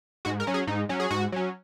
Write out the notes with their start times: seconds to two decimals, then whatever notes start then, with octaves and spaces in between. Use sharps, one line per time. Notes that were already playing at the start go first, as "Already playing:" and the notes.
0.25 G#2 F#4
0.40 A#4
0.47 F#3 C#4
0.54 G#4
0.67 G#2 D#4
0.89 F#3 C#4
1.00 G#4
1.10 G#2 F#4
1.32 F#3 C#4